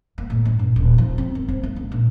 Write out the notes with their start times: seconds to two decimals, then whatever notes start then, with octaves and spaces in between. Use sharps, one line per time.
0.18 A#3
0.30 A2
0.45 G2
0.59 A#1
0.76 D#1
0.98 F3
1.18 C4
1.35 D#3
1.48 C4
1.63 A#3
1.76 C#2
1.92 A#1